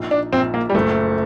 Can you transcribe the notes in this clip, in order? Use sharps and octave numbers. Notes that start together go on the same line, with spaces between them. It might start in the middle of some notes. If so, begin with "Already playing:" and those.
Already playing: A#1 D#4
D4
A#1 C4
A#3
G3
F#1 A3